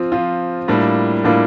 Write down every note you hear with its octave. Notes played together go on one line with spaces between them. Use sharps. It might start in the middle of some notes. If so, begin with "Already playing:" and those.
Already playing: F3 C4 F4
F3 C4 F4
A2 G3 A#3 D4 F4
A2 G3 A#3 D4 F4